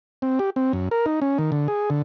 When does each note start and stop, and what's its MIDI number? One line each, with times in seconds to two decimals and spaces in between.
0.22 0.39 60
0.39 0.50 67
0.56 0.72 60
0.73 0.89 42
0.91 1.06 70
1.06 1.20 63
1.22 1.38 61
1.38 1.51 51
1.52 1.68 50
1.68 1.90 68
1.90 2.02 50